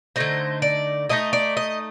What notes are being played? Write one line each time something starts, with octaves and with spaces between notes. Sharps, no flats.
D3 A3 D#4 C5
D5
D3 A3 D#4 D#5
D5
D#5